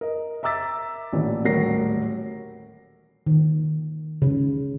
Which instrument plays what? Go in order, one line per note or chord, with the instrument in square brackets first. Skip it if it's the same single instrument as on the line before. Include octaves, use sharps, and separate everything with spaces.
[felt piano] A#4 D#5
E5 A#5 D6 E6 A6 B6
A1 A#2 D3 E3
D#1 A2 F#3 A#4 A#6 C7
[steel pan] D#3
C#3